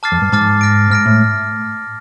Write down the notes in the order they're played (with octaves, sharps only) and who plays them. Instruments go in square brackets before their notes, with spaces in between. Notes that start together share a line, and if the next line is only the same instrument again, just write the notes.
[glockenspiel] A5 D6 F6 A6 C7
[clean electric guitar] F2
G2
[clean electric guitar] G#2 [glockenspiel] A5 D6 F6 A6 C7
[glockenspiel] F6 A#6 D7
[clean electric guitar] G#2 [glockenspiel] F6 A#6 D7
[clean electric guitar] A2